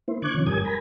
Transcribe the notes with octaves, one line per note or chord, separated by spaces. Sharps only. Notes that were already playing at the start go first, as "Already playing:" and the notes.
A#3 E4 C5
D3 C#6 D6 F#6 G#6
C3 D#3 F3 C#4
G2 G3 A#4 G#5 D#6 G#6
A#4 G#5 A#5 B5